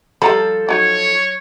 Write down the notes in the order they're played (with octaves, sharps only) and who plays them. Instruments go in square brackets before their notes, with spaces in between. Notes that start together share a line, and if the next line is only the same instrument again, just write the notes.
[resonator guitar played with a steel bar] F3 A4 [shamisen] G3 A#5 B5
[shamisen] F#3 D#4 [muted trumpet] C#5